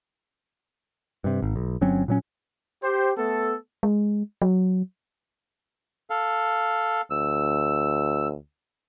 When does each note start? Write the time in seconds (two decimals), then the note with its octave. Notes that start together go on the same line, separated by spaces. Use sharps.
1.24 G2 C3
1.42 G#1
1.56 B1
1.81 G1 F#3 C4 C#4
2.08 A#2 F#3 C#4
2.83 G4 C5
3.17 A3 B3 A4
3.83 G#3
4.42 F#3
6.10 A4 F5
7.10 D2 E6